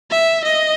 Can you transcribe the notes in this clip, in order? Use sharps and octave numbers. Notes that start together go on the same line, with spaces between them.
E5
D#5